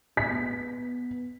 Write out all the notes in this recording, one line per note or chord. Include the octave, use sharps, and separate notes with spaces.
B3 B6